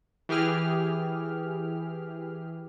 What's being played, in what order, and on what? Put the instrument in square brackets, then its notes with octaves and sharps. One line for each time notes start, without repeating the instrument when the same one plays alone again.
[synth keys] E3 G4 G#4 F6